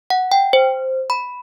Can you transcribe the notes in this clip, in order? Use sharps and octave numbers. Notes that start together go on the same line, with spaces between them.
F#5
G5
C5
B5